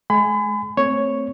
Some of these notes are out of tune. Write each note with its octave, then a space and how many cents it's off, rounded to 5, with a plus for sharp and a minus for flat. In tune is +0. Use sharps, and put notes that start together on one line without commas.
G#3 +35 G#5 +0 B5 +40
A3 +25 C4 +0 C#5 +0